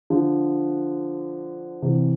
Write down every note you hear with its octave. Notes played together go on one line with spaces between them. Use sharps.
D3 F3
C3 E3